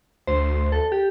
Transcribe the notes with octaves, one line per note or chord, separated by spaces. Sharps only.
D2 C5
A4
G4